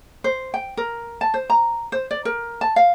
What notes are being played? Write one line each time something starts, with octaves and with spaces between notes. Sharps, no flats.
C5
G5
A#4
A5
C5
A#5
C5
D5
A#4
A5
F5